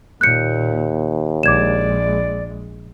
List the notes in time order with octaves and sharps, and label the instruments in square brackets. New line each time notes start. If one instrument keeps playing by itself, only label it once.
[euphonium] D#2 [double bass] A#2 [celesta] F#6 G6 C#7
[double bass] A#1 G#3 [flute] D5 [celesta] D6 G#6 E7